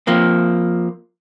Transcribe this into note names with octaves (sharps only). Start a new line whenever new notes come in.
F3 A#3 C4